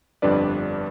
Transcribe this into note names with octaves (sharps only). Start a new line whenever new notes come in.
G1 F2 G3 D4 B4 D5